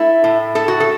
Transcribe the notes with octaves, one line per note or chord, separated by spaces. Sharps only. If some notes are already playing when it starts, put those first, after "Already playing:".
Already playing: A3 E4
A2
A3 A4
F#4
A4